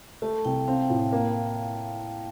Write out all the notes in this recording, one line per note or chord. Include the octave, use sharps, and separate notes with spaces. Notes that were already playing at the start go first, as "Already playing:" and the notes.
A3 A5
C2 G5
C4 F5
G5
A2
A#3